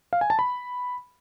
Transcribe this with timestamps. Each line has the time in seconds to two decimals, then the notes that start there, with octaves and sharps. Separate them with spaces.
0.13 F5
0.21 G#5
0.30 A5
0.39 B5